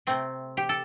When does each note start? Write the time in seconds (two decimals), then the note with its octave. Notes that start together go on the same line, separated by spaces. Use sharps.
0.07 C3 A3 C4
0.57 G4
0.69 A4